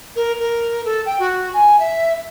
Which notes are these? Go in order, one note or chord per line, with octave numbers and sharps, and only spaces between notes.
A#4
A#4
A4
G5
F#4
G#5
E5